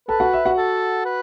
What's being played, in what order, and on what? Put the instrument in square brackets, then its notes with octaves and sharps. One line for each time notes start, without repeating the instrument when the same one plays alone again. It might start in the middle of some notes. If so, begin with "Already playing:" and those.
[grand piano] A4 A5 [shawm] B4
[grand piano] F#4 F#5
E5
F#4 F#5
[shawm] A4
B4